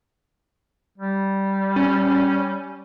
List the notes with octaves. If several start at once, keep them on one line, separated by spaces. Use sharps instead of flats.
G3
C#4